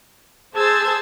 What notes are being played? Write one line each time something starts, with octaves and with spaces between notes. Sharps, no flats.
G#4 C5 A5 E6 G#6 A6